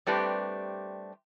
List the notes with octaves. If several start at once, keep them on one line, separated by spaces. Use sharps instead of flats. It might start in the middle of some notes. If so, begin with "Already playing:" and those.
G3 A3 C4 D4 G4 B4